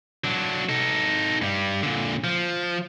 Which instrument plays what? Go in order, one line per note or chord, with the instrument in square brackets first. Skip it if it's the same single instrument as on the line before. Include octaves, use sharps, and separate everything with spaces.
[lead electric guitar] F#3 D4
D#4 A4
G2 G3
A#2 D3
F3